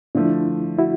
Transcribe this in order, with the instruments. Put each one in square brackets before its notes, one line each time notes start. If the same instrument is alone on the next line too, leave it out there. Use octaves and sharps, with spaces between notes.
[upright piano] D3 F3 A3 [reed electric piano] D4 E4
[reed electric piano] E4 F#4